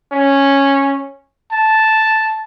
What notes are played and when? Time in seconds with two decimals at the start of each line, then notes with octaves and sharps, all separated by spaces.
0.12 C#4
1.52 A5